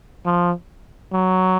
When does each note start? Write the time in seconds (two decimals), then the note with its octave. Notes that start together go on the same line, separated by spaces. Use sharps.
0.25 F3
1.12 F#3